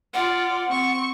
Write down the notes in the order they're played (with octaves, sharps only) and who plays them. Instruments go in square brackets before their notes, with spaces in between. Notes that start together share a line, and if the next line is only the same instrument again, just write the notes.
[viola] F4 D5 [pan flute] F#5
[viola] C4 C#6